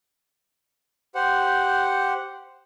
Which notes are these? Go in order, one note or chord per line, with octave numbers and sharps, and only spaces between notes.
G4 C5 F#5